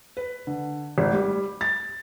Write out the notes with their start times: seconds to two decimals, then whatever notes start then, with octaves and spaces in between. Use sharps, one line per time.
0.17 B4
0.47 D3
0.98 G#1
1.13 G3
1.61 A6